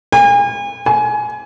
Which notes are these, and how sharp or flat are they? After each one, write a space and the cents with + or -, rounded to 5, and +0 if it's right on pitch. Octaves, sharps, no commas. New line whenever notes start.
G#5 -40
G#5 +25